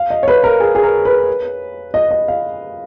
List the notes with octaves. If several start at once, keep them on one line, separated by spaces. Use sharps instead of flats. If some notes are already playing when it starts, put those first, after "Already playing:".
Already playing: F5
D#5
C#5
B4
A#4
G#4
G#4
A#4
B4
D#5
D#5
F5